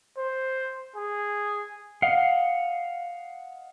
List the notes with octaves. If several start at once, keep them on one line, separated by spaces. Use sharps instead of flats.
C5
G#4
D#5 F5 F#5